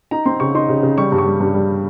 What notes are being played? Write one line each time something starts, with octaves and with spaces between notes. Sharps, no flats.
D#4 A#5
C4 C6
C#3 C#6
D#4 C6
C#3
C#3
G3 C#6
G2
C#6
G3
G2
G3